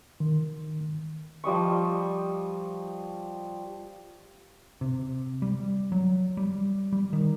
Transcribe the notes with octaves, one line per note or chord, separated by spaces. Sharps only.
D#3
F3 G3 D#5 C#6
C3
G3
F#3
G3
G3
D#3